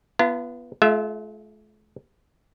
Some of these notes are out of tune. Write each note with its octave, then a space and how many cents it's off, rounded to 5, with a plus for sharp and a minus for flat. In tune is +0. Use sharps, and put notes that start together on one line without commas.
B3 -5 F4 -45 A#5 -40
A3 -45 F4 +0 E5 +0